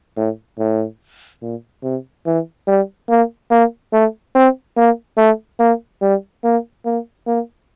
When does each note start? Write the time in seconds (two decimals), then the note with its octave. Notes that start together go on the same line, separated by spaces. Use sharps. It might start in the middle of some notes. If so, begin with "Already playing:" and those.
0.16 A2
0.59 A2
1.42 A#2
1.83 C3
2.26 E3
2.67 G3
3.09 A#3
3.51 A#3
3.93 A3
4.35 C4
4.77 A#3
5.17 A3
5.59 A#3
6.02 G3
6.44 A#3
6.85 A#3
7.27 A#3